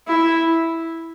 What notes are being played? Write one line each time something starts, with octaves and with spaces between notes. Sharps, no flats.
E4